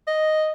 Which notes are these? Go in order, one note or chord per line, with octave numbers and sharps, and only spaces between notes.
D#5